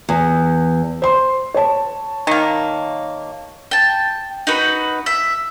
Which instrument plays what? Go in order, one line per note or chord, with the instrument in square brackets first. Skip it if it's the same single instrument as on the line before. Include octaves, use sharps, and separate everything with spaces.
[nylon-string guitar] E2
[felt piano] C5 C6
C#5 A5
[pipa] D#3 A#3
[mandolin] G5 A5
D#4 F#4 B4
E5